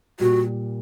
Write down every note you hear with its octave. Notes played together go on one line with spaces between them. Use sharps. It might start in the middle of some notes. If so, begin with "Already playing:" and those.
A#2 G3 F#4